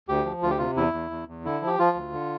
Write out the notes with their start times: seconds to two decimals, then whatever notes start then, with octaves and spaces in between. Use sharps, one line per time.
0.09 D2 G4
0.25 F3
0.43 D2 F4
0.50 G4
0.58 C3 F4
0.76 E2 E4
0.93 E2
1.11 E2
1.28 E2
1.45 D3 E4
1.62 F3
1.67 G4
1.79 F3 F4
1.96 D2
2.13 D3